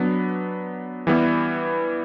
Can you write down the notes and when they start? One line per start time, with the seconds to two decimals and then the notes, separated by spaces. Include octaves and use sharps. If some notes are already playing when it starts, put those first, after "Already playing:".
Already playing: F#3 B3 D4
1.07 E3 G3 B3 E4